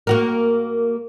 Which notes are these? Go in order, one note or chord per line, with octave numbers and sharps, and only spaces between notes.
A#3 F#4 A#4